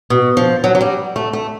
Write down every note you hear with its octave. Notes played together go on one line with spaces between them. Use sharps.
B2
F3
F#3
F#3
G3
A3
A3